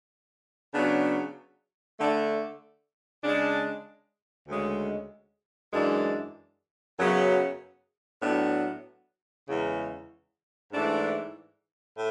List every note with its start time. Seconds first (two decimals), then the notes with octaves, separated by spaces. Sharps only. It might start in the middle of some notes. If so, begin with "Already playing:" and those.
0.73 C#3 F#3 B3 D4
1.99 D3 A3 D4
3.23 C#3 G#3 D4
4.48 D2 C#3 G#3
5.73 F#2 E3 G#3 D4
6.98 F#2 C#3 F#3 B3
8.22 A2 F#3 B3 D4
9.47 E2 C#3 G#3
10.72 G#2 E3 A3 D4
11.96 A2